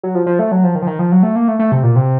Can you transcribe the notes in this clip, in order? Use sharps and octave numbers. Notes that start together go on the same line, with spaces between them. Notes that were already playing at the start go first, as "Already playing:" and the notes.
F#3
F3
F3
A3
F#3
F3
D#3
F3
D#3
F3
F#3
A3
A#3
A3
A3
C3
A#2
C3